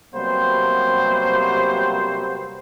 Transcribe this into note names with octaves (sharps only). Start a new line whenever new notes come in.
C3 F#3 G3 A#3 B3 C5